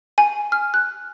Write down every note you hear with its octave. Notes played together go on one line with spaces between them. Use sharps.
G#5
F6
F#6